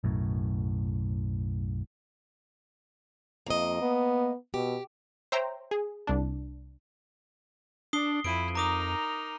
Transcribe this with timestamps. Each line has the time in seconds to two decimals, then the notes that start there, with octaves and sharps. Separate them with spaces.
0.04 B1 F#2 A2
3.47 F2 A#3 D#5
3.81 B3
4.54 B2 G4
5.32 C5 C#5 E5 G5 A#5
5.71 G#4
6.07 C2 D4
7.93 D4 D#6 C7 G7
8.24 F2 E4 D7 D#7
8.55 D#4 A#4 A#5 D6 D#6